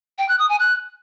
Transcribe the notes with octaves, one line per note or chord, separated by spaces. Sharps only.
G5
F#6
D#6
G#5
F#6